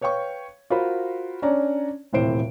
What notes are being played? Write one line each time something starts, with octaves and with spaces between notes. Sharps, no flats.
B4 C#5 F5 G5 C#6
F4 F#4 A#4 C5 B5
C#4 D4 C#5 D5 A#5
D#1 A2 C3 E3 C5 D7